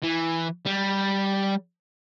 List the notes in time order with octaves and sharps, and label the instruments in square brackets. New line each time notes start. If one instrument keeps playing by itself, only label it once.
[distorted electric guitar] E3
G3